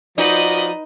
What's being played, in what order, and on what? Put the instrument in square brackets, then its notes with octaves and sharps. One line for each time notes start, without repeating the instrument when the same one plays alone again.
[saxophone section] F3 F#4 D5 [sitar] D#4 [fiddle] B4 D#5